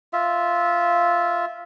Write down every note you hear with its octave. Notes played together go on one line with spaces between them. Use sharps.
F4 E5